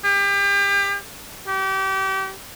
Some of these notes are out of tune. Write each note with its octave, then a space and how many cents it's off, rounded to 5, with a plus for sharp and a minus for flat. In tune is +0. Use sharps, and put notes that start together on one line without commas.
G4 +35
G4 -30